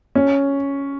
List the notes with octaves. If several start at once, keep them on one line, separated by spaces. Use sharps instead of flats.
C#4